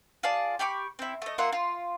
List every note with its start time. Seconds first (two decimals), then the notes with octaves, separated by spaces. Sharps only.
0.23 F4 G#4 D5 A5
0.59 G4 B5 C#6 D6
0.99 C4 E4
1.22 A3 D#5
1.38 A#3 F4 E5 F#5
1.53 F4